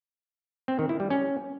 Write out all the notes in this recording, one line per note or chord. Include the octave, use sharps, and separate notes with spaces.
C4
D#3
E4
G3
C#4